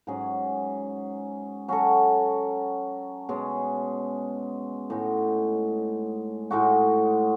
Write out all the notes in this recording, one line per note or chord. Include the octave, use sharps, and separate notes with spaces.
G#2 F#3 C#4 G#4
F#3 C#4 F#4 A4
B2 G#3 C#4 G#4
A2 G#3 D#4 F#4
A2 G#3 D#4 F#4